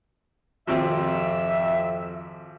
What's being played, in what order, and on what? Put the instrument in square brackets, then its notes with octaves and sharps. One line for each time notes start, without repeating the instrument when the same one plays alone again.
[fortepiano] G#1 C3 C4 [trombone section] F2 [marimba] D#3 F4 [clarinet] E5